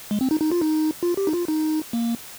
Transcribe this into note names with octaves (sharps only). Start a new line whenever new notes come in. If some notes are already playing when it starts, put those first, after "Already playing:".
G#3
C4
D#4
D#4
F4
D#4
F4
G4
D#4
F4
D#4
A#3